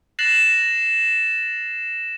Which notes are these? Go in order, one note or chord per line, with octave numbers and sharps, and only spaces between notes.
F#6 A6 A#6 C7 E7 F#7